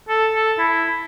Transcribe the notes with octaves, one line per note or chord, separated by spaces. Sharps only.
A4
A4
E4